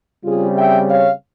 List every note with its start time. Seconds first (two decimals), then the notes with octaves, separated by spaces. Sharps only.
0.25 C#3 G3 C4 F4 G#4
0.56 E5 G5
0.88 C#5 F5